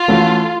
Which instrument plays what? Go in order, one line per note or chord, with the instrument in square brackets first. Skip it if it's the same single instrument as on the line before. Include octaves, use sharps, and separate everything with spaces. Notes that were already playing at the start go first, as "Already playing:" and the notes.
Already playing: [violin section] F4
[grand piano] E3 A3 C#4 F#4